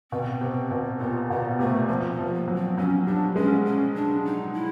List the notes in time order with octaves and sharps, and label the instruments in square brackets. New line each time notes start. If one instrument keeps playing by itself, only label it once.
[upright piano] B2 [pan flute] C4
[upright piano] C3
B2
[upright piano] A#2 [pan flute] B3
[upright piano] B2 [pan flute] B3
[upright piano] C3 [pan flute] A3
[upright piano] F3 [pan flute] A#3
[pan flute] B3
[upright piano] F3
[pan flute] A3
A#3
[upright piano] F#3
[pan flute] C4
[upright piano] F#3 [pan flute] C#4
[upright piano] G3 [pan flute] D4
[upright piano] G#3 [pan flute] C#4
[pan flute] C#4
D4
D#4
E4